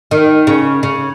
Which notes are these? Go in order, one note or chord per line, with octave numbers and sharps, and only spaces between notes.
D#3
C#3
C#3